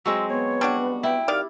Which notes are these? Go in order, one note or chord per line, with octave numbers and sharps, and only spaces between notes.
F#3 G#3 C4 E6
B3 C#5
G3 D4 F#4
E4 G5
D#3 G4 D5 F5